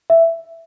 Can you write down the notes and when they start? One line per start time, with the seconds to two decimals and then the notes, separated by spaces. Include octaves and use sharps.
0.10 E5